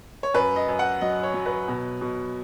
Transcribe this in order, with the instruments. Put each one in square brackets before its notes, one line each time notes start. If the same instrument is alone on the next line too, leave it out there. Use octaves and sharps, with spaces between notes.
[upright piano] C#5
F#2 B4
D#5
F#2
F#5
F#3 D#5
C#5
F#3
B4
B2
B2